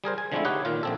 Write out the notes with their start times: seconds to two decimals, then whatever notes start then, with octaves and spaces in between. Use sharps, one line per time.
0.04 G3 G#4 A#4 C5
0.18 G#5
0.32 D3 F3 G#3 A3 C4 E4
0.45 D#4 G4 B4 C#5 F#5
0.65 A#2 D#3 F4
0.83 A#1 C4 A4